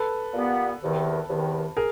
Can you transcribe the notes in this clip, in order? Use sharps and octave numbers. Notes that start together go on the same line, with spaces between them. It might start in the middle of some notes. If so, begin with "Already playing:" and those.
Already playing: A4 B4
A#2 G3 B3
E2 C3 D#3
E2 C3 D#3
G#4 A#4